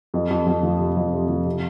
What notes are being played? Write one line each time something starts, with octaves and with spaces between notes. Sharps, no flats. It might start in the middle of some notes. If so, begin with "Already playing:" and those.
F2
F2
F2
F3
C3
F2
C3
F3
C3